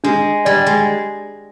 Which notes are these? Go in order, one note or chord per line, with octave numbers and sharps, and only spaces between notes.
G#3 D4
G3 D5
G#3